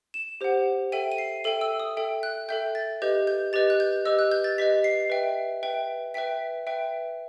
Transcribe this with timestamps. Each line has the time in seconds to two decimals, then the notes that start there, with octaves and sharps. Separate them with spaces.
0.14 E7
0.41 G4 C5 F#5
0.92 A4 E5 G5 D#7
1.12 D#7
1.18 C7
1.44 A4 E5 G5 D#7
1.61 E6
1.80 D#6
1.97 A4 E5 G5
2.23 F#6
2.49 A4 E5 G5 G6
2.75 A6
3.02 G4 B4 D#5 G6
3.27 G6
3.53 G4 B4 D#5 A6
3.70 F#6
3.80 G6
4.05 G4 B4 D#5 E6
4.19 F#6
4.32 G6
4.44 A6
4.58 G4 B4 D#5 B6
4.84 C7
5.10 B4 E5 G5
5.63 B4 E5 G5
6.14 B4 E5 G5 B6
6.67 B4 E5 G5